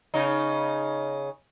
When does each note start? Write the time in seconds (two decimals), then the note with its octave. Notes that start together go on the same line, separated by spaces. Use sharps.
0.14 C#3 D#4